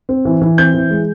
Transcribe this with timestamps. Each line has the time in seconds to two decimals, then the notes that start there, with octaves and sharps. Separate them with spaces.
0.09 C4
0.25 E3
0.41 E3
0.58 C4 G6
0.74 E3
0.91 G#3